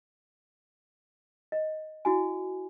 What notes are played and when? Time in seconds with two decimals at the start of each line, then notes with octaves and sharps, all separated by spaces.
1.52 D#5
2.05 E4 F#4 G#5